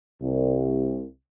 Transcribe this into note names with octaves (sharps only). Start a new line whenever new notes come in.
C2